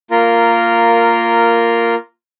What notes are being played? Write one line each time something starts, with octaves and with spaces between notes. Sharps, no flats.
A#3 F4 A#4